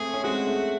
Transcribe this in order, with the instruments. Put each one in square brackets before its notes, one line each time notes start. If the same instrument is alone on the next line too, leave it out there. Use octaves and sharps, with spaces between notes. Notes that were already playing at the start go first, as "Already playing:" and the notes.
Already playing: [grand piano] A3 C4 [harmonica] G#4
[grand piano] C#4
[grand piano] G#3 C4 [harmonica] F#4
[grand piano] A3